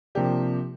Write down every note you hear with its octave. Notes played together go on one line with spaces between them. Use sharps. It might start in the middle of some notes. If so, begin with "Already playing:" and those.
C3 F3 A#3 D4 G4